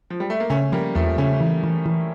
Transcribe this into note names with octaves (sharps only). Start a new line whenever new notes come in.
F3
G3
A3
A#3
C#3 A3 C#4
F3 G3 A#3
E2 F3 A3
C#3 A3 C#4
E3
E3
E3